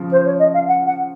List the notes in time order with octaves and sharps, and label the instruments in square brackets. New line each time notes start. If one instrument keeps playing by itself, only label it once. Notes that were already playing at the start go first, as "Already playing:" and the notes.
Already playing: [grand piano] C#3 F3
[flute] C5
C#5
D#5
F5
F#5
F#5